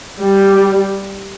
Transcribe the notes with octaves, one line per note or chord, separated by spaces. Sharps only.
G3